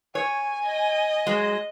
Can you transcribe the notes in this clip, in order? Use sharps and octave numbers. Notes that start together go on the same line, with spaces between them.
C#5 G#5
D#5
F#3 G#3